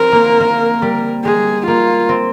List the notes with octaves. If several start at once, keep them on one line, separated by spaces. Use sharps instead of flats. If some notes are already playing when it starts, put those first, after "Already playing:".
Already playing: C4 A#4
A#3
A#3
G3
G#3 G#4
A#3 F4
C4